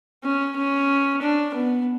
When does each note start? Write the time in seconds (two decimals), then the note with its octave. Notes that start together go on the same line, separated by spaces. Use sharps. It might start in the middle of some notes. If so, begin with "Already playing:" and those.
0.24 C#4
0.57 C#4
1.21 D4
1.54 B3